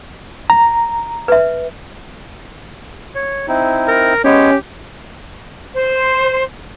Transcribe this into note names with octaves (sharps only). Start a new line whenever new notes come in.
A#5
B4 E5
C#5
C4 D#4 E4
A#4
G#3 B3 C#4 G4 C#5
C5